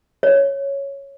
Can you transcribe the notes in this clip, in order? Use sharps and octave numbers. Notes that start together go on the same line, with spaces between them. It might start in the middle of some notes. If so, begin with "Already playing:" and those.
C#5